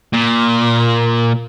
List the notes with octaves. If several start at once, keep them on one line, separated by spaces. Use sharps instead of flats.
A#2